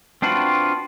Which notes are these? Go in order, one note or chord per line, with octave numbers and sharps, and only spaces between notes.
C4 D4 F4 F#4 B4